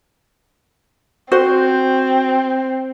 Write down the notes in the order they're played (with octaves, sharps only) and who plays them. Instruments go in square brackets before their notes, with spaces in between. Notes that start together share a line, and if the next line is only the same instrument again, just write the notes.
[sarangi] C4 [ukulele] F#4 C5